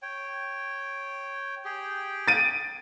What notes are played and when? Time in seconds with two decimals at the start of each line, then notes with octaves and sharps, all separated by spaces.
0.02 C#5 G5
1.65 G4 G#4 G5
2.28 A6 D7 D#7